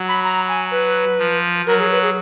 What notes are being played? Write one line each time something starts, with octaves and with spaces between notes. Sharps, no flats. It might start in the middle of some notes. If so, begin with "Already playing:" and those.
Already playing: F#3
B5
A#5
G#5
B4
F3
F#3 A#4
G#4
B4
G#4